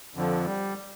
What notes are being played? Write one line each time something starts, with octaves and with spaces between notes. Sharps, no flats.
F2 D3 F3
G3